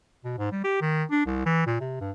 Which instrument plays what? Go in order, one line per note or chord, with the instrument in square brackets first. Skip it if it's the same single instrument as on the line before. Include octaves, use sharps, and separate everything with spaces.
[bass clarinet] B2
G#2
G3
G4
D#3
D4
C2
E3
A#2
C3
G2